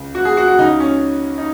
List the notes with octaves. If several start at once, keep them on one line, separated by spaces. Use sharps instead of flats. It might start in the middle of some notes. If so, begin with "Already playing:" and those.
Already playing: C#2 C#3
F#4
G#4
F#4
F#4
C#2 C#3 D#4
C#4
D#4